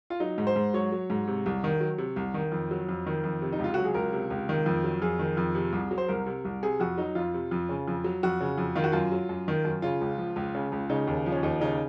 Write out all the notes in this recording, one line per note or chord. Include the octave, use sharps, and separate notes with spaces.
F4
F#3 D#4
G#2
C5
G#2
F#3 C#5
F#3
G#2
C3
C2
D#3
F#3
C3
C2
D#3
F2
F#3
F2
D#3
F2
C3
D#4
C#2
F4
F#3 F#4
G#4
C#2 A#4
C3
C#2
D#3
F2
F#3
F2 G#4
D#3
F2
C3
C2
F#3
C5
C2 A#4
C3
C2
C3 G#4
F2 F#4
F#3 D#4
F2 F4
C3
F2
C#3
F2
F#3
F2 F#4
C#3
F2
D#3 F4
F#4
F#2 F4
F#3
F#2
D#3
F#2
C#3 F4
C#2
F3
C#2
C#3
C#2
C#3 D#4
D#2
F3
C#4
D#2 D#4
C#3 D#4